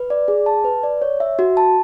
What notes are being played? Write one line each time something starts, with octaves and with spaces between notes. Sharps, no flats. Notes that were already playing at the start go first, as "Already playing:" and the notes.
Already playing: B4
D5
G#4
A5
B4
D5
C#5
E5
F#4
A5